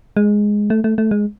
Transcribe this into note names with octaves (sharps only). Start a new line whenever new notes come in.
G#3
A3
A3
A3
G#3